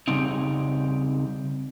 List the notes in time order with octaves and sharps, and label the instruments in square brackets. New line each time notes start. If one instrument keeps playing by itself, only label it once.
[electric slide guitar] C#3 G3 C4 D#4